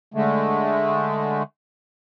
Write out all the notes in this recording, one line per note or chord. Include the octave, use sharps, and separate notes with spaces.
D3 G#3 A3